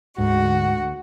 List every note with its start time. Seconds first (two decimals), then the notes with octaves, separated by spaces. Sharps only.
0.18 D2 G#2 F#4